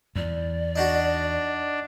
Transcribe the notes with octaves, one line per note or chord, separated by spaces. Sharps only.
E2 D5
D4 D#4 F#4